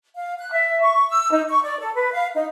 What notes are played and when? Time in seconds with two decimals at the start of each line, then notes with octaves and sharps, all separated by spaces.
0.15 F5
0.38 F#6
0.50 E5
0.81 C#6
1.09 E6
1.31 D#4
1.48 C#6
1.64 D5
1.79 A4
1.94 B4
2.12 F5
2.35 D#4